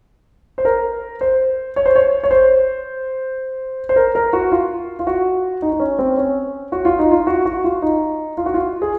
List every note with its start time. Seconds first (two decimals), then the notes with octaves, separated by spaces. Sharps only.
0.58 C5
0.65 A#4
1.21 C5
1.76 C#5
1.86 C5
1.96 C#5
2.24 C#5
2.31 C5
3.89 C5
3.96 A#4
4.15 A#4
4.33 F#4
4.52 F4
4.99 F4
5.07 F#4
5.62 D#4
5.72 D#4
5.80 C#4
5.99 C4
6.18 C#4
6.72 F#4
6.85 F4
6.99 D#4
7.11 F4
7.27 F#4
7.45 F#4
7.64 F4
7.82 D#4
8.37 F4
8.46 F#4
8.54 F4
8.82 G#4